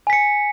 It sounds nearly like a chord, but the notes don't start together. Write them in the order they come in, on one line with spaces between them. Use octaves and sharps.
G#5 B6 C#7